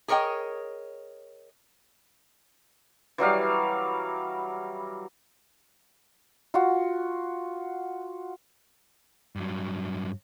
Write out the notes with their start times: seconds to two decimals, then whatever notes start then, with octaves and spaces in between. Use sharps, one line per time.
0.08 G#4 A#4 C#5 D#5 G5
3.18 E3 F#3 G3 F5
6.54 F4 F#4
9.36 G2 F#3